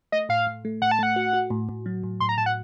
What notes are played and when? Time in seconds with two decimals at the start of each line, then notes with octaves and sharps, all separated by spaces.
0.12 A3 D#5
0.29 A2 F5
0.47 A2
0.65 A3
0.82 A2 F#5
0.91 A5
0.99 A3 F#5
1.16 F#4
1.33 F#4
1.50 A2
1.69 A2
1.86 F#3
2.03 A2
2.20 A2 C6
2.29 A#5
2.38 A2 A5
2.46 F#5